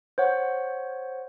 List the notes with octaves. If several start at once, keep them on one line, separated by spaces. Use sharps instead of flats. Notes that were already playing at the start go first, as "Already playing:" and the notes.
C5 C#5 F#5